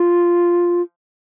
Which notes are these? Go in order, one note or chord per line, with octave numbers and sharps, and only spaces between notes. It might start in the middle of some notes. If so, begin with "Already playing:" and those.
Already playing: F4